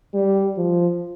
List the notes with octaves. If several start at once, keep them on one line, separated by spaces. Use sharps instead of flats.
G3
F3